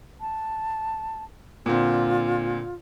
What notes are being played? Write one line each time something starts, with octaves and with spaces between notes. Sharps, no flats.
A5
A#2 D3 C4 F4